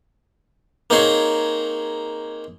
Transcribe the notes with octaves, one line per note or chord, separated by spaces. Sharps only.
A#3 C4 D#4 G#4 C#5